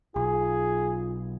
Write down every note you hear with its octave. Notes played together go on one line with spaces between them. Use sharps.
B1 F4 G#4